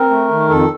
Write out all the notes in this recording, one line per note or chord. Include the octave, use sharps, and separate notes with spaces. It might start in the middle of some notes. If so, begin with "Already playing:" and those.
Already playing: C4 A#4
A3
D#3
F2 A4